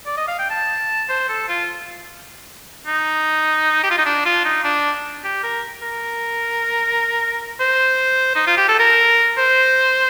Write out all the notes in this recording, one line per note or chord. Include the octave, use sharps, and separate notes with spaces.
D5
D#5
F5
G5
A5
C5
A4
F4
D#4
G4
F4
D#4
D4
F4
D#4
D4
G4
A#4
A#4
C5
D#4
F4
G4
A4
A#4
C5